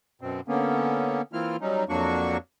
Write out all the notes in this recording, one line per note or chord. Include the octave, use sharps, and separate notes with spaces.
F#2 B2 C4
D3 A#3 B3 C#4
E3 A#3 C4 E4 F4 F6
F#3 G3 C#4 D#4
F2 F#3 A#3 D4 F#4 C#6